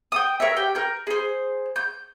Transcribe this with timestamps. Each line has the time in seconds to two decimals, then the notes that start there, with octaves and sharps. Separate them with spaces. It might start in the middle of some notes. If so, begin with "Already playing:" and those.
0.12 G5 D#6
0.40 A#4 C#5 E5
0.57 G4 G5
0.75 A#4 G6
1.07 G#4 C5
1.76 G6